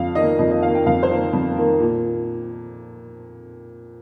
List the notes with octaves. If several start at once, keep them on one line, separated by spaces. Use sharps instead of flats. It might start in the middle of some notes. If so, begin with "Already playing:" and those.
Already playing: F2 F5
D#3 A#3 D#5
F2 D#5
D#5
D#3 A#3 F5
G5
F2 F5
C5
D#3 A#3 A#4
F2
D#3 A#3
A#2